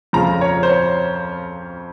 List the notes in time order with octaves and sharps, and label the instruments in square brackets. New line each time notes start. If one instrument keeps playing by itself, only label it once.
[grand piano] F2 C#3 F3 A#5
C#5
C5
C#5